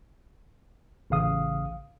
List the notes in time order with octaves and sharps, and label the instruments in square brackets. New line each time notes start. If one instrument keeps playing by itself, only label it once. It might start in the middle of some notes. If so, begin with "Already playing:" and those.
[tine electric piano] A1 C#3 F5 D#6